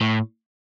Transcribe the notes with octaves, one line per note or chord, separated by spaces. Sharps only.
A2